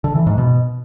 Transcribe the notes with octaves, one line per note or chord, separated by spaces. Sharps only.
D3
E3
G#2
B2